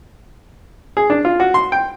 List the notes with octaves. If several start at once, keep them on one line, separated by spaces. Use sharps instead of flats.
G#4
D4
F4
F#4
C6
G5